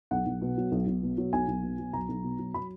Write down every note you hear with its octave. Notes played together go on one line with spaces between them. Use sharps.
B1 F#5
B1
B2
F#3
B1
B1
B2
F#3
B1 G#5
B1
B2
F#3
B1 A#5
B1
B2
F#3
F#3 B5